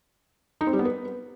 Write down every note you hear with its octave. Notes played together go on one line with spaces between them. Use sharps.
D#4
C4
G3
B3
B4